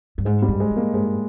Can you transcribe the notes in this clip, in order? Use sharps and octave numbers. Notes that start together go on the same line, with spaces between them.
G2
G#2 G#3
G3
G2
G#3
E3
A#3
G2 G#3